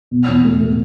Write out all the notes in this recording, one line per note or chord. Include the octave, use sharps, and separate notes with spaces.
B2
E2
A3
A3